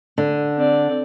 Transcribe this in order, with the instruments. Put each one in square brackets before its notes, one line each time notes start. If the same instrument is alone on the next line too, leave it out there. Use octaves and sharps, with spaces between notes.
[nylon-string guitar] D3
[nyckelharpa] C4 D5